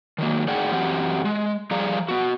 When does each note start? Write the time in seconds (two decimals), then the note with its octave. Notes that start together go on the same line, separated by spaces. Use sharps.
0.18 D#3 F#3 A#3
0.48 A2 D#4 G#4 D5 F#5 G5
0.72 F#2 E3 F#3 C4 G4 F#5
1.25 G#3
1.71 F3 G3 G#4 D5 F5 A#5
2.08 B3 F#4